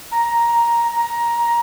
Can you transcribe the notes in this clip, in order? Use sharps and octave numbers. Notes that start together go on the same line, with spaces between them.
A#5
A#5